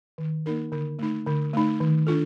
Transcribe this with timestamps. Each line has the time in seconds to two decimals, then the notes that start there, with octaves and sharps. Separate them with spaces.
0.18 D#3
0.46 A#3 D#4 A#4
0.72 D3
0.99 A3 D#4
1.26 D3
1.53 A3 D#4
1.80 D#3
2.07 D4 F4 A4